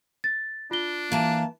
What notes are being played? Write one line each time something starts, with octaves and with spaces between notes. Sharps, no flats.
A6
D4 F4 G7
E3 A#3 A5